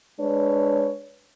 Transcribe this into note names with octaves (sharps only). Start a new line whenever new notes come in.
G#3 D4 B4 C#5